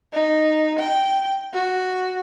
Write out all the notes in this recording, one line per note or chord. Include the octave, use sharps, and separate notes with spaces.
D#4
G5
F#4